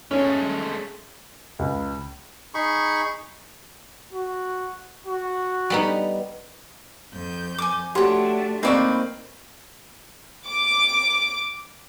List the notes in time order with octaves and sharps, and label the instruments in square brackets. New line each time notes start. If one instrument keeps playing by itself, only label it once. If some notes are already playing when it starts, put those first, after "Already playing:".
[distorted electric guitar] G#3 A3 [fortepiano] C#4
[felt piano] C#2
[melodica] D#4 G#4 B5 C#6
[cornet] F#4
F#4
[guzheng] G3 B3 D#4
[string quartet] F2 G6
[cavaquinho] G#5 D6
[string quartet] A3 D4 [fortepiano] F#4 G4 C6 [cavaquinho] C#5 F#5
[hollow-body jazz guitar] A#3 C4 D#4 [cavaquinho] B4 D5 C#6
[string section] D6